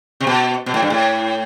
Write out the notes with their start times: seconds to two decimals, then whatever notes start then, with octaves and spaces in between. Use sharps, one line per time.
0.21 C3
0.27 B2
0.66 B2
0.74 A2
0.82 G2
0.90 A2